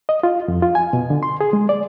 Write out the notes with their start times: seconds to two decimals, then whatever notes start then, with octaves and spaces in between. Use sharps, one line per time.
0.09 D#5
0.23 F4
0.48 F2
0.62 F4
0.75 G#5
0.93 B2
1.10 D3
1.23 C6
1.41 G#4
1.53 G#3
1.69 D5